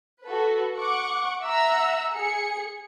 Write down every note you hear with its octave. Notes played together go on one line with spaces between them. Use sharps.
F#4 A4 B4
F#5 C#6 D6
E5 F#5 A#5 E6
G#4 C#7